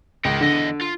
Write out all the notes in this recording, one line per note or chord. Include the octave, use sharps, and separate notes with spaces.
C#2 A#4 G5
E2 D3 D#5
F4